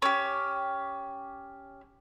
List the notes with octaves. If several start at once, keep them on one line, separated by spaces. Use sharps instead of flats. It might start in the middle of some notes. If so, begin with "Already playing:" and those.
C#4 G4